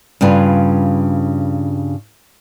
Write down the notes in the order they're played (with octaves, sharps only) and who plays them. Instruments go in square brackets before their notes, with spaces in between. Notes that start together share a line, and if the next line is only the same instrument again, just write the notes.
[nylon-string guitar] G2 C#3 F4 B4